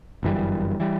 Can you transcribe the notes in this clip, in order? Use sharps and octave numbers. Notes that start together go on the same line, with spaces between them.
G1 F#2 E3 G3
E3 G3